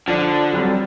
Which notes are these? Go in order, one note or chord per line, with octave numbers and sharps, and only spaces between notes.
D3 F3 D4
F#3 G3 C4